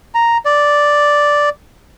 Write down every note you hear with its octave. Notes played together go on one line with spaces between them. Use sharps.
A#5
D5